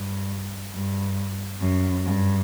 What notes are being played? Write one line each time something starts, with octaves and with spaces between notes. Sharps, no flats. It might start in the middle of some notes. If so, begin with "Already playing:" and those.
Already playing: G2
G2
F#2
G2